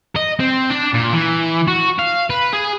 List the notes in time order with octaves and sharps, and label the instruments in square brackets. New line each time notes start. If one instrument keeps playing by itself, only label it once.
[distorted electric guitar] D#5
C4
D4
A#2
E3
F#4
F5
B4
G#4